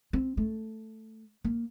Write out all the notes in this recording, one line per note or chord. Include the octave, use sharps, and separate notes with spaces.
C4
A3
A#3